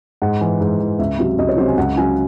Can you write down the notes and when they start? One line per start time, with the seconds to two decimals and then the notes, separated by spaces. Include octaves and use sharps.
0.22 G#2 F#5
0.41 E3
0.61 G#2
0.80 E3
0.99 C#2 E5
1.19 C3 F#3
1.38 C#2 D#5
1.49 C#5
1.57 F#3 C5
1.61 C3
1.68 G#5
1.77 C#2 F#5
1.96 C#3 F#3 G#5